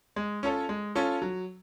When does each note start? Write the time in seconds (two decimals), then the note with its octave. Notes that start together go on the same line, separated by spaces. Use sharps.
0.16 G#3
0.43 C#4 F4 A4 C#5
0.69 G#3
0.95 C#4 F4 A4 C#5
1.22 F#3